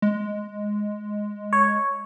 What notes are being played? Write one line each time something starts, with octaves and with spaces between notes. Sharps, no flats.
G#3
C#5